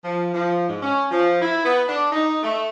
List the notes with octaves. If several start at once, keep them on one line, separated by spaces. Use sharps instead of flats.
F3
F3
G#2
C#4
F3
E4
B3
D4
D#4
A3